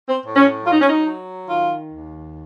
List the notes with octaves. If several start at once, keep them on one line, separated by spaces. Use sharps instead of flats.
C4
A2
C#4
F#3 F4
D#4
C#4
D#4
F#3
D#3 F4
D#2